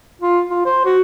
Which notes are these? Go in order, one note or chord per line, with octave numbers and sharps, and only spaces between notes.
F4
F4
C5
F#4